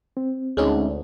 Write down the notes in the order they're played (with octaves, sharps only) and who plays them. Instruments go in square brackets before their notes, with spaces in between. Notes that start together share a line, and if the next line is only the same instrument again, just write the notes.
[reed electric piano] C4
[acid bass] D2 [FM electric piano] G#3 C#4 D#4